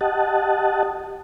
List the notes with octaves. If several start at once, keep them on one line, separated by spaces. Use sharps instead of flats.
G4 D#5 F#5 A5